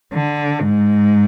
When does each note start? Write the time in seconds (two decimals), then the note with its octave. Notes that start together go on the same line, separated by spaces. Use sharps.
0.13 D3
0.61 G#2